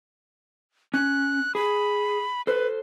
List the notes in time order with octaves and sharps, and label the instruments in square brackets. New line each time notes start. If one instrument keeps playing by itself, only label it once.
[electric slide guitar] C#4 [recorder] F#6
[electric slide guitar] G#4 [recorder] B5
[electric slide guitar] A4 C5 [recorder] B4